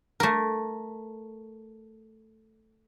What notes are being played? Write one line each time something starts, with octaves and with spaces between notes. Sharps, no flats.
A3 A#4